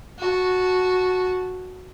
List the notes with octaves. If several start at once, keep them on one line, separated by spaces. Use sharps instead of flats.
F#4 A5